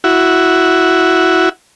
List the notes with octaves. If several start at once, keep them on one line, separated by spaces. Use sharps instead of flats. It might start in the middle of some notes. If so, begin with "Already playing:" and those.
E4 F#4